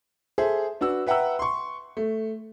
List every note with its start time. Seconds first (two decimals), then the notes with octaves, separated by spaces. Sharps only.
0.38 G#4 A4 C5 E5
0.81 D4 F#4 B4 E6
1.07 B4 E5 F#5 G5 A#5 E6
1.39 C6 C#6
1.97 A3